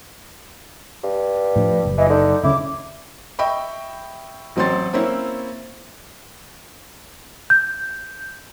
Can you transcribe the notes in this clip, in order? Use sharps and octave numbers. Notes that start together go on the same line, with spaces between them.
G2
A2 F3 D4
F#1
E3 D#5
D3 D#4
D2 C#3 C#4 E4 D6
D#5 E5 G5 B5 C#6
A1 F#3 C4 C#5 C6 A6
A#3 C4 C#4 E4
G6